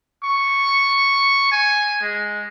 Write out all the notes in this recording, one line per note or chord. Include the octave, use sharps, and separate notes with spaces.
C#6
G#5
G#3